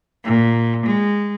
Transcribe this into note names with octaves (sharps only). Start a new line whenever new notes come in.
A#2
G#3